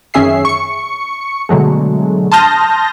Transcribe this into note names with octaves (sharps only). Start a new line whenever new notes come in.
F#2 D#3 C#4 G#4 E5 C7
C#6 C#7
B2 D3 F#3 G#3 A3
A5 C6 D#6 F6 G6 A#6